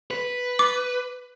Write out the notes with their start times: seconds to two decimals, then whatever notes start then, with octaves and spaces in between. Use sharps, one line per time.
0.11 B4
0.59 D6